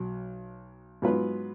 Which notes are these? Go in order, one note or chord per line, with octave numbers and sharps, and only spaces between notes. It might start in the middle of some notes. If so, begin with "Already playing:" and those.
Already playing: B1 F#3
G#2 F#3 B3 F4 B4